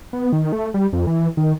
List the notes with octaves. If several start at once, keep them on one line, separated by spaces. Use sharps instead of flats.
B3
D#3
A3
G3
F2
E3
D#3